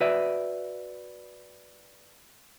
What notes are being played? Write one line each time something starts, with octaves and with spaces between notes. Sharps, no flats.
F#4 B4 D5 E5